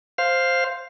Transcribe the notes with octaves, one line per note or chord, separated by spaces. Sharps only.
C5 F5